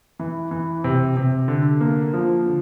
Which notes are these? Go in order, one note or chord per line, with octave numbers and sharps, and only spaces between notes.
E3
E3
C3
C3
D3
A#3
F3
D3